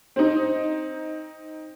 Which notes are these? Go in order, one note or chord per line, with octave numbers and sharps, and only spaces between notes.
C4 D#4